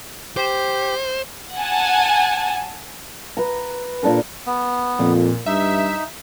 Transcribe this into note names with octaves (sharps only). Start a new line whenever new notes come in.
G4 C5
F#5 G#5 A5
B4 A#5
A#2 D4 A4 A#4
B3
F2 A#2
G2 D#4 E5